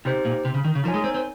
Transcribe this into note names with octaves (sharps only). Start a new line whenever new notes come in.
C3 D#4 G4 C5
A#2
C3
C#3
D#3
C#3
F3 D#4 A#4 C#5 G#5
G#3
C4
C4